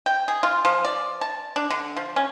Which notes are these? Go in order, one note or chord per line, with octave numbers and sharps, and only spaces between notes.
G5
G#4
F4
F3
D5
A5
D4
D3
F3
C#4